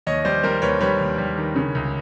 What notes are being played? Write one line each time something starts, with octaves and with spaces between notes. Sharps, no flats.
D#2 C#5 D#5
G3 C5 D5
G3 A#4 C5
D#2 B4 C#5
G3 B4 C#5
D#2
G3
D#3
C#3
C#2